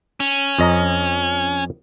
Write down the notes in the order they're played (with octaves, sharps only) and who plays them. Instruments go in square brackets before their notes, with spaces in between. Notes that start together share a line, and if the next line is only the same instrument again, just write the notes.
[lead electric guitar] C#4
[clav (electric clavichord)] F2 D#5 A#5